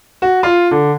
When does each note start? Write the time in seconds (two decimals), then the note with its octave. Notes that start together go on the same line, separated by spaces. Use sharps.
0.22 F#4
0.43 F4
0.71 D3